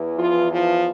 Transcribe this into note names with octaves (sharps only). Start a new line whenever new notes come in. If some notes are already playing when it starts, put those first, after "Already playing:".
Already playing: E2 E3
F3 F4
F3 F4